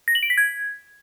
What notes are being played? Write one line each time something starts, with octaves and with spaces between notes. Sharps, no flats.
A#6
F#7
D7
B6
G#6